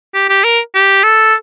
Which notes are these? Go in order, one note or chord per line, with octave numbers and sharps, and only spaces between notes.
G4
G4
A#4
G4
A4